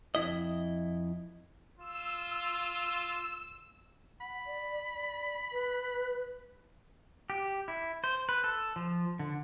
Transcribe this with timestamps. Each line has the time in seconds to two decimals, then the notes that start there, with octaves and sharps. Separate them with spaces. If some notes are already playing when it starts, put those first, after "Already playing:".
0.15 F2 C#3 E4 D#5
1.79 F4 E6
4.21 F#5 B5
4.46 D5
4.95 D5
5.53 B4
7.30 G4
7.68 E4
8.04 C5
8.29 B4
8.44 A4
8.76 F3
9.19 D3